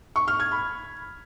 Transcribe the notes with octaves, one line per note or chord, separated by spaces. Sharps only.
C#6
F6
G#6
B5